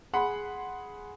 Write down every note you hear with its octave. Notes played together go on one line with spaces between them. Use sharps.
G#4 F#5 B5 C6